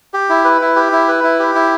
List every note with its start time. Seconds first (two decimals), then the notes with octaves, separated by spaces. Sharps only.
0.14 G4
0.29 E4
0.44 B4
0.61 E4
0.76 G4
0.92 E4
1.08 B4
1.24 E4
1.39 G4
1.55 E4